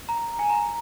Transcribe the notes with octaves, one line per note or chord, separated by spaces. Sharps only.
A#5
G#5
A#5